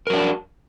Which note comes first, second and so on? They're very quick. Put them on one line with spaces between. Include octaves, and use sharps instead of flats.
A#4 F#3 D4